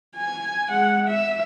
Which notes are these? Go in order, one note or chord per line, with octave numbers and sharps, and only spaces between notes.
G#5
G#3 F#5
E5